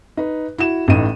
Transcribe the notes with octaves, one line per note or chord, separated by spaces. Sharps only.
D#4 B4
E4 F#4 E7
A1 A2 D#4 D#7